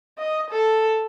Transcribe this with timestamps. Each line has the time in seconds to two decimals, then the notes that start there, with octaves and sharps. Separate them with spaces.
0.18 D#5
0.50 A4